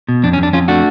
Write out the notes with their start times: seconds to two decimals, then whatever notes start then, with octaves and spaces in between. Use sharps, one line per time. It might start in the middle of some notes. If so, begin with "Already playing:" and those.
0.09 B2
0.23 F2 D4
0.33 C#4
0.39 F2 D4
0.53 F2 C#4 F4
0.68 A3 D4 F#4